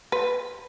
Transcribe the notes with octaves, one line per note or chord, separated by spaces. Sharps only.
B4